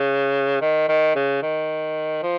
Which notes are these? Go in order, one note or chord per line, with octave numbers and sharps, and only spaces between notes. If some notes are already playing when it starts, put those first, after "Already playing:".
Already playing: C#3
D#3
D#3
C#3
D#3
F3